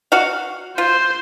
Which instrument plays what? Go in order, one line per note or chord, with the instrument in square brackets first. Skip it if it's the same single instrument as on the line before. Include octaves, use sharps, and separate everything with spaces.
[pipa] F#4 F5
[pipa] F4 [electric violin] C5